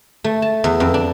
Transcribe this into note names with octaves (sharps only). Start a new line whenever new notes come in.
A3
A5
E2
F2
D4